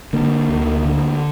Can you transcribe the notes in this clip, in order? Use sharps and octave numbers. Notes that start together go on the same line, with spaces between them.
D3 A#3
D2
D3